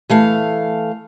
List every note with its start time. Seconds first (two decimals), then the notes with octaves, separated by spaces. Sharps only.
0.10 E3 A3 F5